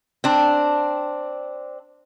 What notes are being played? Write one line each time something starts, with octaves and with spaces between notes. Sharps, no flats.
C4 D4